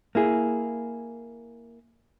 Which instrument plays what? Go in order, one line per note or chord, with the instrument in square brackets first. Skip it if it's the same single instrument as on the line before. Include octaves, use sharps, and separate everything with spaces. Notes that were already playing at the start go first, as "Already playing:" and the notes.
[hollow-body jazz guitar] A#3 E4 G#4